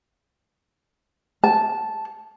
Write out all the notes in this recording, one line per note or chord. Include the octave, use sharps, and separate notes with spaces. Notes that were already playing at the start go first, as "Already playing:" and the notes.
A5